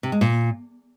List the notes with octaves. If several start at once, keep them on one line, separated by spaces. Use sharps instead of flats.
C3
G#3
A#2